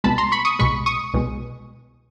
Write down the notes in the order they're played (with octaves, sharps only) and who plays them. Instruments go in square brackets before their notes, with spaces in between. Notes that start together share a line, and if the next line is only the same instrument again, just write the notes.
[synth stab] C2 B2 G#3 A5 B5
A#5 C6
B5 C#6
C#6 D#6
C2 B2 G#3 B5 C#6
C#6 D#6
C2 B2 G#3